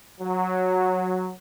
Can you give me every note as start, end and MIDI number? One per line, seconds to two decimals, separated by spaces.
0.20 1.32 54